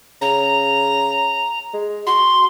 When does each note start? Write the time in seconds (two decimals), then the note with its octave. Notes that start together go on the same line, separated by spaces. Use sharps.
0.21 C#3 A#5
1.73 G#3
2.06 F#4 C6